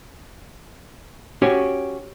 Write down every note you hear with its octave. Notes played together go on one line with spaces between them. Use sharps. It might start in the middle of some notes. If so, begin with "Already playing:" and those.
C#4 F#4 G4 C#5